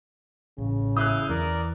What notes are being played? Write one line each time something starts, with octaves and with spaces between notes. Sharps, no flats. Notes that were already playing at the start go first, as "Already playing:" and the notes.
A1 C#3
E4 F5 D#6 F#6 G6
E2 E3 A#4 D5